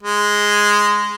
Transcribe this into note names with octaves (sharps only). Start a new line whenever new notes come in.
G#3